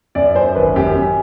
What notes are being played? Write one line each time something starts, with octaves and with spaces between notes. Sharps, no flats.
F#2 D5
F#2 C5
G#1 B4
F#2 G4
F#2